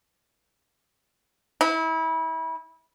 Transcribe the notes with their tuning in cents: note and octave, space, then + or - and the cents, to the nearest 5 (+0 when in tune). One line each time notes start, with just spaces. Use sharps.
E4 -30